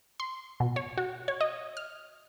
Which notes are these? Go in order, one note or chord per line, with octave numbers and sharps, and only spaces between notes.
C6
B2
C#5
F#4
C#5
D#5
F6